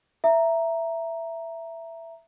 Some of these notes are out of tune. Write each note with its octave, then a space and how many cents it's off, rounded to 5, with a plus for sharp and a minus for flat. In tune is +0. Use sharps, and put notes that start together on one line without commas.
E5 +10 A#5 +0